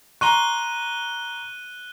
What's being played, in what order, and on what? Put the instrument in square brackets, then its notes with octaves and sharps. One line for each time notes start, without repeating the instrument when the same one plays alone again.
[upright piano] A#5 C6 C#6 [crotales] F#6 D#7 G7